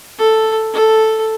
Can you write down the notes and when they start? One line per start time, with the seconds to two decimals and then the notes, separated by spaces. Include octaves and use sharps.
0.18 A4
0.73 A4